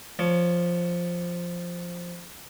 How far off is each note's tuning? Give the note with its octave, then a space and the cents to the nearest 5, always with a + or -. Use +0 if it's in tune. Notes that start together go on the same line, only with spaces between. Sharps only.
F3 +0 C#5 +20